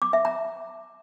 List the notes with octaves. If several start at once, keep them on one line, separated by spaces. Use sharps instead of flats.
D6
E5
A#5